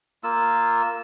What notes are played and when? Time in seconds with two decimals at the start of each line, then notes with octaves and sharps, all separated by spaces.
0.24 A#3 F4 E6